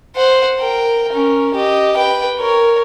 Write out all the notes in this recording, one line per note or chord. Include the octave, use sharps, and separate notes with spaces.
C5 F#5
A#4 G5
C#4 A#4
G4 D#5
B4 G5
A#4 C#5